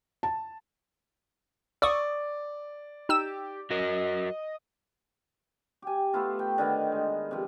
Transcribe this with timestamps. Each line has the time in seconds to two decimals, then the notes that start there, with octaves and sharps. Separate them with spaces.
0.23 A5
1.82 D5 C#6 D#6 E6
3.09 D#4 G4 E6 E7
3.70 F#3 F#4 A#4 D#5
5.82 G4 G#5
6.13 A3 B3 E4 F4
6.39 G5
6.58 D3 D#3 B3
6.92 G#3
7.31 C3 F3